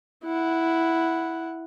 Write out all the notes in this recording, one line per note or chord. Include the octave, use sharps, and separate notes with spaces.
E4 F#5